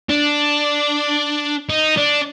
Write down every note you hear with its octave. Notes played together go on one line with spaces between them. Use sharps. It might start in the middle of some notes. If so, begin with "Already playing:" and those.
D4
D#4
D4